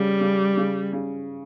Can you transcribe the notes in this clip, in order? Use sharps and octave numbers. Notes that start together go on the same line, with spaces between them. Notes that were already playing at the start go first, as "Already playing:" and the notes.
Already playing: C#3 G3 C#4
C#3
C#3
C#3